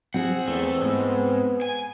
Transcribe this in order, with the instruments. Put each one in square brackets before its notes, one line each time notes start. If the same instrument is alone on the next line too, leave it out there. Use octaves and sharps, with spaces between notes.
[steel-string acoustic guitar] C4 G#4 [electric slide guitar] F#5
[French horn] E2 [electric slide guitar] A3
[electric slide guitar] G#2 [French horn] B3
[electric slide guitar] G#5